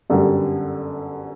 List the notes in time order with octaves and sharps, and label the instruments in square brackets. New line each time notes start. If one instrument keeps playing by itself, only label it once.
[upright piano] G1 F#2 D3 G3